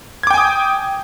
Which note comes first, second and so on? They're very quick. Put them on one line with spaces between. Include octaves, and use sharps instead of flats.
G#6 D6 G5 G#5 D#6